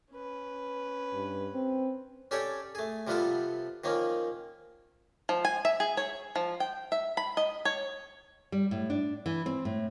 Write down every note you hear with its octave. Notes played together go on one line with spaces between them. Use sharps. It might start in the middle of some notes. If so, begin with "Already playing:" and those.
C#4 B4
G2
C4
C#4 G4 A4 C#5 D5 G5
A3 G#4
C3 F3 G3 B3 F4 A4
D#3 F3 A#3 C#4
F3
G#5
E5
G#4
C#5
F3
G5
E5
B5
D#5
C#5
G3
A2
D4
E3
C4
A2